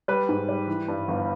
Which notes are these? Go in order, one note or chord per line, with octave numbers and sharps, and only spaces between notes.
G3 B4
G#2
G3
E3
G2
G1